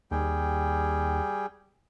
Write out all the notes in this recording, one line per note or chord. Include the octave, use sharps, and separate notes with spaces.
D#2 G3 G#4 G5